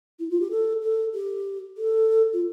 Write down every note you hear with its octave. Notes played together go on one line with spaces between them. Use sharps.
E4
F4
G4
A4
A4
G4
A4
F4